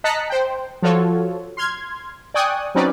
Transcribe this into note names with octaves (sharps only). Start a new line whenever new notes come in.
D#5 A5 A#5 F#6 B6 C#7
C5 G5
F3 F4 F#4 A4 C#5
C6 F6 G#6
D5 G5 G#5 C#6 D#6 F#6
F#3 C4 C#4 D#4 B4 D5